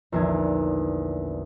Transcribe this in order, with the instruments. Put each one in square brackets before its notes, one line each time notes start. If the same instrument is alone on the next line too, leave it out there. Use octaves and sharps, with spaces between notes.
[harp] A#1 E2 D3 D#4 G#6